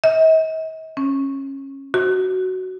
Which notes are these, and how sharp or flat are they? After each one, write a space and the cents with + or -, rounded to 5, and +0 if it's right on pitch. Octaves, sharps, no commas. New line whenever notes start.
D#5 +45
C#4 -20
F#4 +10